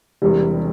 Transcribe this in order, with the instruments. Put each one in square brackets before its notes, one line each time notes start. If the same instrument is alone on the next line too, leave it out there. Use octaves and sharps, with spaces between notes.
[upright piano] E1 E2 C3 G3